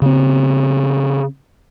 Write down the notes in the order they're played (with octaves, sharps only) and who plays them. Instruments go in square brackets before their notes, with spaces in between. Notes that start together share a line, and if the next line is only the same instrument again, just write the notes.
[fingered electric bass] C#3 C4